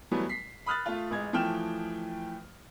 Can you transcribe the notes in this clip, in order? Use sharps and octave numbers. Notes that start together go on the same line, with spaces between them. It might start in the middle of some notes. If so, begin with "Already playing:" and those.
E3 F#3 G3 A3 B3
B6 C7
B5 D#6 F6 F#6 A6
A3 F4
A1 G#3 G#6
E3 F3 A3 G5 F6 E7